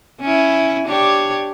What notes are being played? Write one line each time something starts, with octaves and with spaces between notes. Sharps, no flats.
C#4 E4
D4 G4 C#5